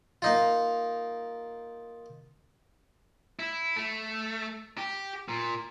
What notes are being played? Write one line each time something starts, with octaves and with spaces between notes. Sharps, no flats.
A#3 D#4 F4
E4
A3
G4
A#2